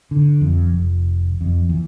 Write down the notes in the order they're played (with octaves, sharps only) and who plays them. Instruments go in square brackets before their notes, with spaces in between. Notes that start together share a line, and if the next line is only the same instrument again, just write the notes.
[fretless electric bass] D3
F2
F1
F2
E2